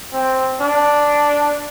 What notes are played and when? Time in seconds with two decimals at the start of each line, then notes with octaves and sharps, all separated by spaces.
0.13 C4
0.61 D4